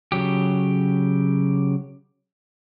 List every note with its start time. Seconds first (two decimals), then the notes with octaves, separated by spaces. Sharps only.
0.12 C#3 F#3 G4